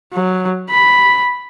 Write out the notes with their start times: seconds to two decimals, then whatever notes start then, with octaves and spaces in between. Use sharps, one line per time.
0.13 F#3
0.70 B5